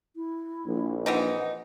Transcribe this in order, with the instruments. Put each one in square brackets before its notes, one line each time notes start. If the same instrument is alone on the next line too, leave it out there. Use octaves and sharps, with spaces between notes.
[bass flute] E4
[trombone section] A#1
[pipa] E3 C4 D#4 [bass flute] F#5